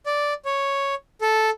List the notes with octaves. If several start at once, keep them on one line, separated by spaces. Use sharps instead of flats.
D5
C#5
A4